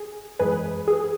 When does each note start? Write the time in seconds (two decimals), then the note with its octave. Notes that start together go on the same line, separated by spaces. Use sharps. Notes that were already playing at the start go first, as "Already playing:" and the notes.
Already playing: G#4
0.39 F#2 E3 G#3 G#4 B4
0.88 G#4